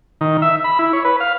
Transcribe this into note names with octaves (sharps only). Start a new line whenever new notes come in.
D#3
E5
B5
E4
C#5
B4
F5